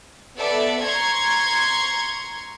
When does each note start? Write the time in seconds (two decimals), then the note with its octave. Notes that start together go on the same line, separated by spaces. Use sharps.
0.37 B3 A4 D5 E5
0.82 A#5 C6 C#6 G#6